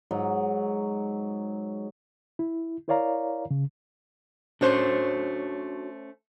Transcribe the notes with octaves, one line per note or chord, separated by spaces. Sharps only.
G#2 F#3
E4
E4 A#4 C#5 D5 F5 A#5
C#3
A3 C#4 D4 F#4 C5 C#5